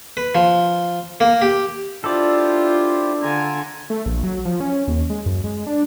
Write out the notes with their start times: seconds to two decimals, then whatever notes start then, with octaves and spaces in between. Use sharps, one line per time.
0.17 B4
0.35 F3
1.20 A#3
1.42 G4
2.04 D4 E4 F4 G4 A4 C5 D5
3.23 D3 F4 G#5 A#5
3.90 A3
4.06 A#1
4.23 F#3
4.45 F3
4.60 C#4
4.88 D#2
5.10 G#3
5.26 F#2
5.44 G#3
5.66 D4